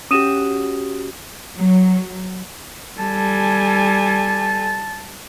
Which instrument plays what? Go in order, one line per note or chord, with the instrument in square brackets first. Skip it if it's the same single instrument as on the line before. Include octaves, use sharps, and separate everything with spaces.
[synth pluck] C#4 F#4 G4 [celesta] D#6 D#7 E7
[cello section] F#3
[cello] G3 [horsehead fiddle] A4 G#5 [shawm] A5